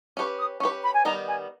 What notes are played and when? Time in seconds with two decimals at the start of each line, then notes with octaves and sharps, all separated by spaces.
0.16 C#4 G4 B4 C#6
0.39 D#6
0.60 C#4 G4 B4 C#6
0.83 B5
0.94 G#5
1.05 D#3 G3 B3 D#4 A#5
1.28 G#5